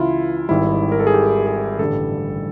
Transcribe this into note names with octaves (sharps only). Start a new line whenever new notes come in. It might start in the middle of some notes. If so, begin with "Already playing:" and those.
Already playing: C#2 C#3 E3 E4 F4
G#1 G#2 D#3 G3 E4
A#4
A4
G#4
G4
G#4
A1 G2 D3 G3 A4